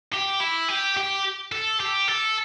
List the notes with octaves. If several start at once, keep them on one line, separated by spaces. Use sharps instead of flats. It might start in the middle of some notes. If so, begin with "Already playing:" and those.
G4
E4
G4
G4
A4
G4
A4